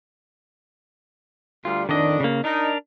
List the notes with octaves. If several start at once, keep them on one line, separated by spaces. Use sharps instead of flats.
D2 G3 F4
F2 A2 D#3 D4 D#5
C#3 A#3
D4 D#4 A#4